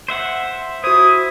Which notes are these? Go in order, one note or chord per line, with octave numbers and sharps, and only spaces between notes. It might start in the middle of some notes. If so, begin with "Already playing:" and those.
C5 E5 F#5
E4 F#4 C5 D#6